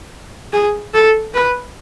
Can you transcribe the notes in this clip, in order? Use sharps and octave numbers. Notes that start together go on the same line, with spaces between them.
G#4
A4
B4